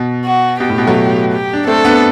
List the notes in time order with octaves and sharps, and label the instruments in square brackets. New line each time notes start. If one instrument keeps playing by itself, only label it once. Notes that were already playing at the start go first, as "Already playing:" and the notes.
Already playing: [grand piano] B2
[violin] F#4
[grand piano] B2 [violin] G4
[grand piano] A2
B2
F#3 A3
[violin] G4
[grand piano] D4
[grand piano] A3 C4 [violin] A4
[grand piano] B3 D4